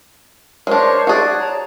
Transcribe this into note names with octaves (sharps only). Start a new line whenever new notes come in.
G#3 D4 A#4 C5 C#5
F#4 G#4 D5 F#6
C#5 A5 A#5